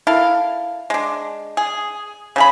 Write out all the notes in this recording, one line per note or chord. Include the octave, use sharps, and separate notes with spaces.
E4 A4 A#4 F5
G#3 D4
G#4
C#3 G#4 B5